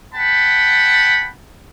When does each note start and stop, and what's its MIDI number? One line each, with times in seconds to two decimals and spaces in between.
0.14 1.29 78
0.14 1.29 79
0.14 1.29 81
0.14 1.29 83